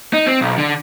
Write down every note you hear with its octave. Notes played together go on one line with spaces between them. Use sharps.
D#4
C4
B1
D3